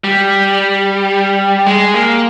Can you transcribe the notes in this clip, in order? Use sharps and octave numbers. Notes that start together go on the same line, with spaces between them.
G3
G#3
A#3